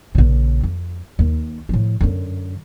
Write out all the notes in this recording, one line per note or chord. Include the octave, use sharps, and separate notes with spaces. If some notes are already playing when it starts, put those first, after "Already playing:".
A#1 C#3
F2
D#2
A2 F3
F#2 D3